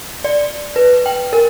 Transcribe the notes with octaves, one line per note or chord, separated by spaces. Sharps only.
D5
B4
G5
A#4